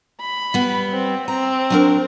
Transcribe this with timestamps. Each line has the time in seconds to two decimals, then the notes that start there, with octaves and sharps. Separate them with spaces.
0.21 B5
0.54 G3 B3
0.90 C4
1.28 C4 A#5
1.70 F#3 D4 A#4